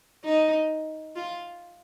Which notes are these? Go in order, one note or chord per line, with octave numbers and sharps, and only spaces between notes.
D#4
F4